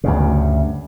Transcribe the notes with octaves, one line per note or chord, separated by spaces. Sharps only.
D2 G2 C#3